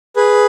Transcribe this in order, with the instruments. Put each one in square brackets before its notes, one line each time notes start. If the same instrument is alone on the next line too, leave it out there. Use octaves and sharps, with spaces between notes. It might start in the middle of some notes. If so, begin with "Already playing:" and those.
[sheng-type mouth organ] G#4 B4